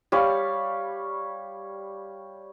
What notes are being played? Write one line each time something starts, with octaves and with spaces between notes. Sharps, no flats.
G3 C#5 F5